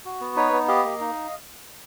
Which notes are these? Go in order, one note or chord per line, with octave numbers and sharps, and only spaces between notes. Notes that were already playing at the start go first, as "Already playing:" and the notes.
F#4
B3
D#4 B4 C#5
B3
G4 D#5 F5
A#3
D#4